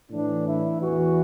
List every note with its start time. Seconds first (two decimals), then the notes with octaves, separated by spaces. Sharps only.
0.10 A2 E3 D4
0.46 E4
0.81 E2 E3 F#4